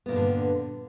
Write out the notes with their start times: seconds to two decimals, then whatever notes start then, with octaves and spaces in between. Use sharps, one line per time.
0.06 B3
0.08 A#2
0.11 E3
0.13 G2
0.16 D3